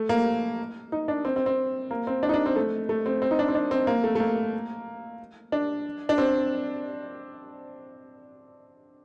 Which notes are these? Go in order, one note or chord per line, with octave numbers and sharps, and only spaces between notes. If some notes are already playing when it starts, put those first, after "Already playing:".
Already playing: A3
A#3
D#4
D4
C4
C4
C4
A#3
C4
D4
D#4
D4
C4
A3
A3
C4
C4
D#4
D4
C4
D4
C4
A#3
A3
A3
A#3
D4
D4
C4